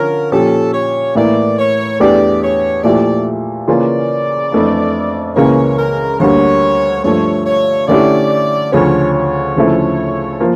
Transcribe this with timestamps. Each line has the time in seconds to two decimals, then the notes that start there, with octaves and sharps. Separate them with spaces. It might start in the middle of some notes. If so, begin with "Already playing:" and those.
Already playing: D3 F3 C#4 A#4
0.32 A#2 F3 C#4 G4 A4
0.73 C#5
1.15 A2 E3 A#3 E4 D5
1.58 C#5
2.00 E2 E3 A3 D4 G4 D5
2.43 C#5
2.83 A#2 F3 A3 E4 G4 D5
3.68 C#3 E3 A#3 C#4 F4 D5
4.52 F2 E3 A3 D4
5.36 C#2 C#3 E3 A#3 C#4 C#5
5.79 A#4
6.20 D2 D3 G3 A#3 C#5
7.04 G2 F3 A3 C#5
7.46 C#5
7.88 D3 A3 C#4 E4 G4 D5
8.72 D2 C#3 F3 C#4 C#5
9.14 C#5
9.56 D2 C#3 F3 A3 E4
10.40 F3 A#3